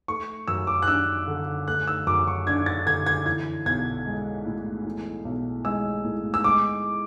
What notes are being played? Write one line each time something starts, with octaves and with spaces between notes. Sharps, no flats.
A3 C#6
F#2 E6
D6
F#6
D4 E6
D3
A3 F#6
E6
F#2 D6
C#6
D4 G#6
A6
D3 G#6
G#6
E3 G#6
B1 G#6
G#3
A2
E3
B1
G#3 E6
A2
E6
G#3 D6